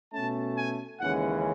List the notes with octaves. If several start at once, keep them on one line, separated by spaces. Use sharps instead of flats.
B2 A3 C#4 A5
G#5
D#2 C#3 E3 G#3 C#4 F#5